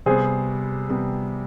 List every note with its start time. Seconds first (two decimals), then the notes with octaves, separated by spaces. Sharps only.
0.06 C3 G3 B3 G#4 C5
0.89 C3 G3 B3